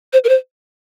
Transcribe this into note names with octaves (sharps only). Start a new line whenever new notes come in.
C5
A#4
C5